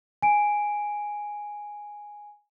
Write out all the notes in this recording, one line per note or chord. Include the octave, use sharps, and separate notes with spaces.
G#5 D7